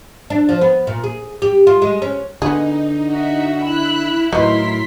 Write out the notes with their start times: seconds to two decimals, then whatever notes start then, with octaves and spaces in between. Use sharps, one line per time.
0.30 D4
0.49 F3
0.61 B3
0.87 A#2
1.04 G#4
1.42 G4
1.67 F4
1.82 G#3
2.02 C#4
2.42 D3 B3 D#4 G#4
3.10 F#4 E5 F#5
3.63 E4 B5 E6 F#6
4.33 A2 D#3 F#3 A#4 B4 C6 B6